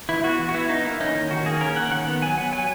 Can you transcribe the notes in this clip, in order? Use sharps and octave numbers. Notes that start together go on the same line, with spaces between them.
E3 E4
B3 F#4
E3
F#4
B3 E4
E3 D#4
A#3 E4
C#4 D#4
D#3
D#3 F#4
A#3 G#4
C#4 A#4
D#3 F#5
D#3 F#5
B3
F#3 G#5
B3 F#5
F#3 G#5